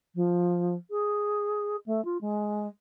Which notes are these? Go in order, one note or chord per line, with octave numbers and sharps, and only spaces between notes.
F3
G#4
A3
F4
G#3